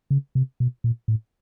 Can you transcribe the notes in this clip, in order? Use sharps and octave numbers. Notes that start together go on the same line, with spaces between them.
C#3
C3
B2
A#2
A2